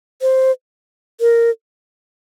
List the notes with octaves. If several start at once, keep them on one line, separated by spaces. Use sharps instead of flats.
C5
A#4